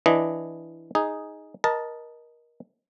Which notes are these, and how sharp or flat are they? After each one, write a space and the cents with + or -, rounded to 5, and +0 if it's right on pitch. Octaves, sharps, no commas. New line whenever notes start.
E3 +0 D4 +0 D#5 +0
D#4 +5 G#4 +0
A#4 +25 D#5 +0 A5 +0